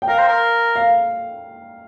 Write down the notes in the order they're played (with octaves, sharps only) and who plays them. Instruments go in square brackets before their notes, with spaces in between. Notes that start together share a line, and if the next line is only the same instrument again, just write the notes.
[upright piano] G5
[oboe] A#4 [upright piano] F5
[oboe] C5
A#4
[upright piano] F5